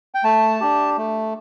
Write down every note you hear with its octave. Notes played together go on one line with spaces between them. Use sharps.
G5
A3 A5
D4 G4
A3